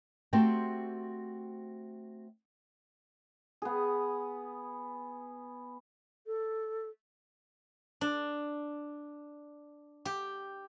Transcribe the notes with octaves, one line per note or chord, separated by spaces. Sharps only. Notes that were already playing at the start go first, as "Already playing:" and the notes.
A3 C4 F#4 G4 C5 G5
B3 G#4
A4
D4
G4